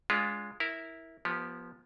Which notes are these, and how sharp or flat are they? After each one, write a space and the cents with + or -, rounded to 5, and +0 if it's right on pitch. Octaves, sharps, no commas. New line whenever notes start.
G#3 +0 D4 -35 F4 +5
E4 -10 A#4 +0
F3 +0 B3 -25 G4 +0